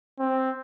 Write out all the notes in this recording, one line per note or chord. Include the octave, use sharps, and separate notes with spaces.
C4